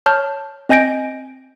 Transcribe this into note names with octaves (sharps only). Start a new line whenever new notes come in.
C#5 A5 F6 G6
C4 D#5 G#5 G6 A#6 D7